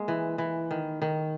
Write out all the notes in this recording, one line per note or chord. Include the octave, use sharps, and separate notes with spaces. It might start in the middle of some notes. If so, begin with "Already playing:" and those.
Already playing: G#3 A#3
E3
E3
D#3
D#3